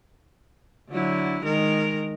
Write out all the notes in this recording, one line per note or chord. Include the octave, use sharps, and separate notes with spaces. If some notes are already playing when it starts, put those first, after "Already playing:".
D3 F#3 E4
D#3 G#3 A#4